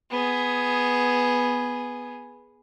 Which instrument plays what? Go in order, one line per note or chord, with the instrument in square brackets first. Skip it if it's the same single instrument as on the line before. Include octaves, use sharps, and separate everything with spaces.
[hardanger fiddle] B3 G#4